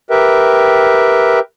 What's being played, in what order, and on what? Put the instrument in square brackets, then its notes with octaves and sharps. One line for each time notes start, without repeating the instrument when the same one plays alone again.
[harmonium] G4 A#4 B4 E5 G5